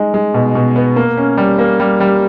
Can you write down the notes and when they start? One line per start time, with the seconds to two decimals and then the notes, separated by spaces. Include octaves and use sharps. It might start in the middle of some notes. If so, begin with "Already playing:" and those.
Already playing: G#3 D#4
0.14 G#3
0.34 B2
0.55 B2
0.76 B3
0.96 A#3
1.17 C#4
1.37 G3
1.59 A#3
1.80 G3
2.00 G3